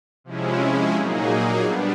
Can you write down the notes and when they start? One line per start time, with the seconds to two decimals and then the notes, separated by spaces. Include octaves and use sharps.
0.24 C3 F3 G#3 C#4 E4
0.93 A#2 F#3 A#3 D#4 G#4
1.62 G3 B3 D4